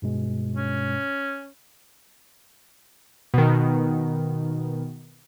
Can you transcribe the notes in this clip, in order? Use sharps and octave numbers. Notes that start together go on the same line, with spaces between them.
G2 B2 G#3
C#4
B2 D#3